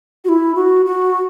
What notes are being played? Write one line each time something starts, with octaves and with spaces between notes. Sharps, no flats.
F#4
E4
F#4
F#4